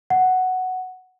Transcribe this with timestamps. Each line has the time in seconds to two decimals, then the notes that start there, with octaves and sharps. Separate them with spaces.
0.10 F#5